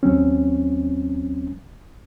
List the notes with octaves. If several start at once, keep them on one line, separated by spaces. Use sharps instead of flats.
D#2 F#3 C4 C#4